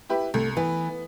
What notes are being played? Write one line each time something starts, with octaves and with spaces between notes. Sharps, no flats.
E4 G4 B4
C2 A3
E3 B3